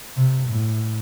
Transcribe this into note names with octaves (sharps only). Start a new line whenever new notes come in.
C3
A2